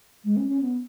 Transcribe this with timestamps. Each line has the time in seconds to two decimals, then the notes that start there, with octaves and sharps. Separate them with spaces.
0.24 G#3
0.37 C#4
0.49 C#4
0.61 B3